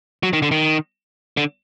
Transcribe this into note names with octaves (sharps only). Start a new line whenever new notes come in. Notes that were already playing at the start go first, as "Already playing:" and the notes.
F#3
D#3
D3
D#3
D3